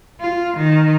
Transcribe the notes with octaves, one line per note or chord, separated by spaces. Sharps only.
F4
D#3